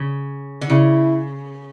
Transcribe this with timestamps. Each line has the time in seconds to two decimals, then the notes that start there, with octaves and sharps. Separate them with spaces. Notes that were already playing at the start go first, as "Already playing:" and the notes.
Already playing: C#3
0.61 D3
0.69 C#3 E4